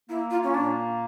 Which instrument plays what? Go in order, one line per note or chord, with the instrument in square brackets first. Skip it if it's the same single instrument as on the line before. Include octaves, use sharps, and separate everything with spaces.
[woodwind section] A#3 [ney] E4
[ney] F4
C#4
[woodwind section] A#2 [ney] D4